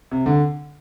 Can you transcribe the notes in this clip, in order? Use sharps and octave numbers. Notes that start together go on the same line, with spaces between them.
C3
D3